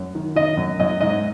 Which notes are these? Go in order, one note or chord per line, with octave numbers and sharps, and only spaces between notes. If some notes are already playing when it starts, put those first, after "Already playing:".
Already playing: F#2
D#3
D#3 D#5
F#2
F#2 D#5
G#2 D#5